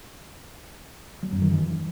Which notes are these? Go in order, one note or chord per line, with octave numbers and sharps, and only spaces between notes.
F#3
F#2
D#3
E3